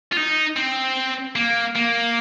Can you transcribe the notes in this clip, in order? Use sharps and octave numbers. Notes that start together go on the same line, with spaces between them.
F4
D#4
C4
A#3
A#3